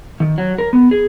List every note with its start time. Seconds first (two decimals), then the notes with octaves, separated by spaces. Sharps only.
0.20 D#3
0.38 F#3
0.58 A#4
0.73 B3
0.91 G#4